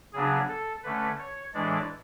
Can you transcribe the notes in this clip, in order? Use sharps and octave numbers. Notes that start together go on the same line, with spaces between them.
C#3 F#3 B3 D4 G#4
A4
D3 A3 C#4 B4
C#5
A2 E3 G#3 D4 D5